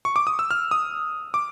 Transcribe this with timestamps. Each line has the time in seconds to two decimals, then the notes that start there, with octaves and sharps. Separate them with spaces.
0.05 C#6
0.16 D6
0.27 D#6
0.39 E6
0.51 F6
0.71 D#6
1.34 D6